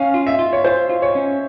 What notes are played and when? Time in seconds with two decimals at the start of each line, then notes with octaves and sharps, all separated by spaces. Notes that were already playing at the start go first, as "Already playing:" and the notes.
Already playing: C#4 F5
0.14 F4
0.27 E5
0.39 F4
0.53 C#5
0.64 F4 C5
0.90 F4
1.02 C#5
1.15 C#4